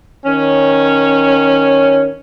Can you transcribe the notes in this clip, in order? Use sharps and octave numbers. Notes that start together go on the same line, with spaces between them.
D#3 C#4